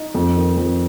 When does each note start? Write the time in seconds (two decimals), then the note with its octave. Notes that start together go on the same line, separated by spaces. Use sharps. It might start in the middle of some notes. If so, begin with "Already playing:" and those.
Already playing: D#4
0.14 F2
0.36 D#3
0.57 F2